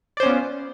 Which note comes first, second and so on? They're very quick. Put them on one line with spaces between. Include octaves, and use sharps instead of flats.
D5 C5 C#4 B3 F4